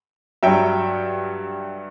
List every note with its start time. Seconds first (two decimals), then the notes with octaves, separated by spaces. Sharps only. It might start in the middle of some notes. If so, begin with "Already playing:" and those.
0.43 G2 F#3 E5 G5